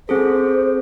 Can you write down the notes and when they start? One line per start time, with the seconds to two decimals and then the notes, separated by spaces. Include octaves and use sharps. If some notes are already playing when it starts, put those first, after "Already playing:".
0.09 C4 G#4 A4 C5